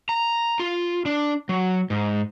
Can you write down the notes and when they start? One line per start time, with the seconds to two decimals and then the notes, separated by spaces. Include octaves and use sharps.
0.09 A#5
0.60 F4
1.06 D4
1.49 F#3
1.90 G#2